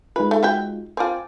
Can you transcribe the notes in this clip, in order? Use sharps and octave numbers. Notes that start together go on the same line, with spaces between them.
G#3 D#4 F4 B4
A3
F#4 E5 G5
C4 F4 G#5 A5 D6